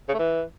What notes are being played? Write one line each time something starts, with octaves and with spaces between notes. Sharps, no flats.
C#3
A3
E3